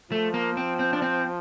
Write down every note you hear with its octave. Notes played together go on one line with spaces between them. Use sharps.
F3 A3
A#3
C4
C4
D4
C4